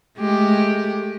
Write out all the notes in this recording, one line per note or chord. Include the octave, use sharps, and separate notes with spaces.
G#3 A3 G4